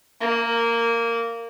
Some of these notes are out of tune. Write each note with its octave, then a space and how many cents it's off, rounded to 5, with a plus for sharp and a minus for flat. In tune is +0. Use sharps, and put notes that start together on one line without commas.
A#3 -10